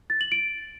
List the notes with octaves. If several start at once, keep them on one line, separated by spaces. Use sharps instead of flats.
A6
F#7
D7